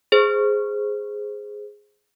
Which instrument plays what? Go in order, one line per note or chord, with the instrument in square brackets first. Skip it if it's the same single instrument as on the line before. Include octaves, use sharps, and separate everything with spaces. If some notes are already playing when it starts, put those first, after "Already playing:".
[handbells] G#4 C5